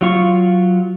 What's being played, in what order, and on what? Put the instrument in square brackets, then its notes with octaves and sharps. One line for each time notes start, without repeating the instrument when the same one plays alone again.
[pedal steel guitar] F#3 F4 C#6